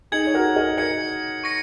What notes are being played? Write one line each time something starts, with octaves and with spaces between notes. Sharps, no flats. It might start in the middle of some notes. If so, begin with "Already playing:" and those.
D#4 G#4 G#6 C#7 F#7
C#5
F#4 A#4
A#4 D#5
A#4 D#5 G#6 C#7 F#7
C#6 A#6 C#7